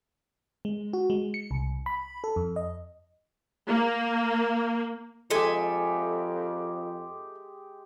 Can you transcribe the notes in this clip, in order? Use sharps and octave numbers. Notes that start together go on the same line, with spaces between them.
G#3
F#4
G#3
C#7
C2
B5
A4
F2
D#5
A#3
F2 G#3 G4 A4 E5 G#5